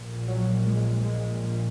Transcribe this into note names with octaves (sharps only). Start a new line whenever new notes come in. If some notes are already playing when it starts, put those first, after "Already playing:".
Already playing: A#1 A#2
F#3
G#3
G#3